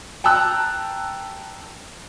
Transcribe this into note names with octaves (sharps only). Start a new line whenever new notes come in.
G5 A5 A#5 E6 F#6